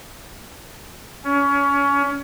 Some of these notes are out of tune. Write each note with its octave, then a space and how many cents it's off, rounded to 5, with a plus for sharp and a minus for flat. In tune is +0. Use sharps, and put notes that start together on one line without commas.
C#4 +25